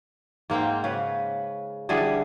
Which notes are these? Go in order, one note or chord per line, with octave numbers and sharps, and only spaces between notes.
G#2 A#3 C4 G5
C#3 B4
D3 E3 G3 G#4